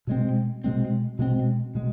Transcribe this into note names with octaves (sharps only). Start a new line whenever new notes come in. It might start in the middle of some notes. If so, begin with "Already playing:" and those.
B2 G#3 C4
B2 G#3 C4
B2 G#3 C4
B2 G#3